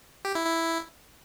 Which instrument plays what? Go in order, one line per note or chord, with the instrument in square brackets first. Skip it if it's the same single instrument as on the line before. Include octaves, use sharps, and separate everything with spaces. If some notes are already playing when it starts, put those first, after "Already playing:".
[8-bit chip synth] G4
E4
E4